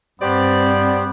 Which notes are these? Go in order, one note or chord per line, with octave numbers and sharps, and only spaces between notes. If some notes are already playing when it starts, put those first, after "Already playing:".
G2 B3 C4 G4 C5 D5